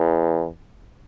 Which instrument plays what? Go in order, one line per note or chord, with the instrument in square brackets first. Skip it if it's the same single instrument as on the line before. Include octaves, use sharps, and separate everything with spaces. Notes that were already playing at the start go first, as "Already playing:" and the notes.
Already playing: [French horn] E2